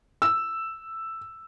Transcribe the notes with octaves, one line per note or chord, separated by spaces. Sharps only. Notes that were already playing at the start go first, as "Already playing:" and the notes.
E6